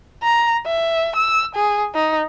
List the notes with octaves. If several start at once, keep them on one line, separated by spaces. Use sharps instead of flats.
A#5
E5
E6
G#4
D#4